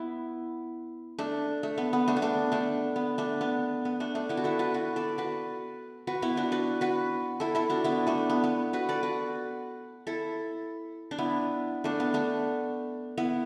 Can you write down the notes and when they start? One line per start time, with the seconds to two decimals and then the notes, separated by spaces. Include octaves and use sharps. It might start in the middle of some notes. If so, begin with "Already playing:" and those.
Already playing: B3 E4
1.19 A3 D4
1.63 A3
1.78 B3
1.93 B3
2.08 A3 D4
2.17 B3
2.22 A3 D4
2.52 A3 D4
2.96 B3
3.18 A3 D4
3.41 B3
3.85 B3
4.00 A3 D4
4.15 A3 D4
4.29 B3 E4
4.37 F#4
4.44 E4 A4
4.59 F#4 B4
4.74 F#4 B4
4.96 A4 D5
5.18 F#4 B4
6.07 F#4 B4
6.22 B3 E4
6.37 D4 F#4
6.52 F#4 B4
6.81 F#4 B4
7.40 E4 A4
7.55 E4 A4
7.70 D4 F#4
7.84 B3 E4
8.07 A3 D4
8.30 B3
8.44 B3
8.73 F#4 B4
8.89 A4 D5
9.03 F#4 B4
10.07 E4 A4
11.11 D4
11.18 B3 E4
11.84 A3 D4
12.00 B3
12.14 A3 D4
13.17 B3 E4